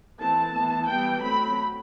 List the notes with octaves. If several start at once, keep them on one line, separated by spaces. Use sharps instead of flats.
E3 A3 C4 A5
E3 B3
E3 G3 B3 G5
F#3 A3 C4 B5